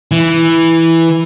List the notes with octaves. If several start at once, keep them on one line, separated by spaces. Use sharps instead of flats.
E3